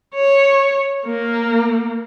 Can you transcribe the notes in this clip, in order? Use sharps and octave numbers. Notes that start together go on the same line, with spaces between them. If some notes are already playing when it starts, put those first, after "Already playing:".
C#5
A#3